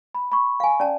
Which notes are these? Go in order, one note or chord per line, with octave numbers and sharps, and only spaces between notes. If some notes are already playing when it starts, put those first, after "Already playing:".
B5
B5 C#6
F5 G#5
C#4 D5 A5